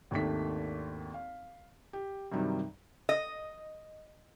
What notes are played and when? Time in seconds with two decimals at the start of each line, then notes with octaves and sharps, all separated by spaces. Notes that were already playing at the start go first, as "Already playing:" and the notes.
0.11 G#1 D#2 D#3 A3 D4 B6
1.14 F5
1.93 G4
2.32 G2 C3 D#3 F#3 G3
3.09 D#5